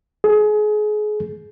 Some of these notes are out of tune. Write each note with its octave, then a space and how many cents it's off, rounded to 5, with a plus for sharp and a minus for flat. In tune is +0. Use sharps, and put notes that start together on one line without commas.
G#4 +30